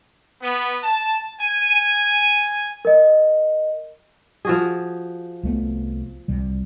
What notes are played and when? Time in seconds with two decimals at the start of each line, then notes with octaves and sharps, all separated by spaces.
0.41 B3
0.83 A5
1.40 G#5
2.85 A#4 D#5
4.45 F3 F#4 G#4
5.43 C2 A3 B3
6.28 C2 C3 G3